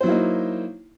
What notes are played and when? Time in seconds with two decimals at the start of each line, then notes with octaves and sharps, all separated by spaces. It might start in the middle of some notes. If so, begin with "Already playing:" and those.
0.01 C5
0.03 F#3
0.06 E4
0.09 A#3
0.11 D#4